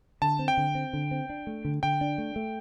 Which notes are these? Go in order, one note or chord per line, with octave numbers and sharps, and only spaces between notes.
D3 A5
C4
G5
D3
C4
D3
C4
D4
A3
D3
D3 G5
D4
A3
A3